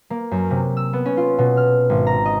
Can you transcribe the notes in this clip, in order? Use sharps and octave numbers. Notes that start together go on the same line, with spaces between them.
A#3
F#2
C3
E6
B3
C#4
F4
B2
F6
G#1
A#5
D#5